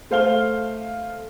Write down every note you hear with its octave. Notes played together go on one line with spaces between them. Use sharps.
A3 C5 F5 F6 G7